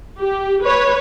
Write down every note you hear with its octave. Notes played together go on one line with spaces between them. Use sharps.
G4
B4 C#5